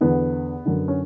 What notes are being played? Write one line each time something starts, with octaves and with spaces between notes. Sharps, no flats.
E2 D3 B3
F#2 D3
C#4